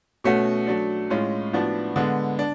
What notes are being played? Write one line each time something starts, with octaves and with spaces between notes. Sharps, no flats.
B2 A3 C#4 F#4
F#3 A3 D4
A2 G#3 C#4 F4
A2 F3 B3 D4 F#4
D3 G#3 B3
D4